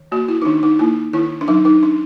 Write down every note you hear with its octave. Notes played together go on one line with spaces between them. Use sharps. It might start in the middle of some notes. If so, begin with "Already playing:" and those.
Already playing: D#3
A#3 F#4
E4
D#4
D#3 D4
D#4
A#3 E4
D#3 E4
D4
F#3 D#4
D#4
D4